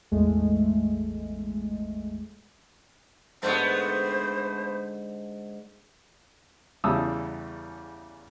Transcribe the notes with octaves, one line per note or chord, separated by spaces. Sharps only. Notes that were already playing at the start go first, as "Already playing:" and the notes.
A1 E2 G#3 A3
G#2 D3 A3 B3 C5
E2 C#3 G3 A5 D#6 E6